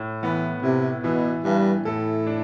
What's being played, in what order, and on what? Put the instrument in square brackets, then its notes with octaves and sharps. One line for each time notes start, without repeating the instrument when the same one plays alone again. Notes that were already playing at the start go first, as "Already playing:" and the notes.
Already playing: [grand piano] A2
[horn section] E3 [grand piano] B3
[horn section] C3 [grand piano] E4
[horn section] B2 [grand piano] E3
[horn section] G2 [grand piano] E3
[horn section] A2 [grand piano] A4
[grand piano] D4